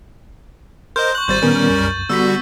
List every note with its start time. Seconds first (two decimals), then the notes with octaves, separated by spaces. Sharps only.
0.96 A#4 C5 D#5 C6 G6
1.15 C#6 F#6 F#7
1.28 G#1 G3 C5 G6 A6 D#7
1.42 A#2 D#3 G3 B3 C#4 A#4
1.70 C2 F#2
2.09 D3 G3 B3 F#4 E6 B6